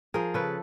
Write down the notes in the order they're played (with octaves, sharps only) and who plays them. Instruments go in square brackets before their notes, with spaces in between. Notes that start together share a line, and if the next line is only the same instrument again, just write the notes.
[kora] F3 G#4 A#4
C#3 A4 B4